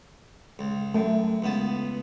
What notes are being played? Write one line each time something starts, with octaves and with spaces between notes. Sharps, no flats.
C#2
F#2 A3
C#2 B3 A5